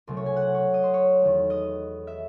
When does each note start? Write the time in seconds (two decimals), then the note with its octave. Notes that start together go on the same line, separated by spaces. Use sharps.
0.07 C2 C3 F#3 A3
0.17 C#5
0.26 G#5
0.36 F#5
0.54 C#5
0.74 D#5
0.83 C5
0.94 C#5
1.22 E2 D#3 A3
1.50 D#5
2.07 E5